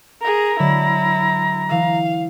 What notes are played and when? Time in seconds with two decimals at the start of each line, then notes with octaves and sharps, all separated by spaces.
0.21 G#4 A#4 A#5
0.59 D3 F#3 G#3 E4
1.69 E3 F5 E6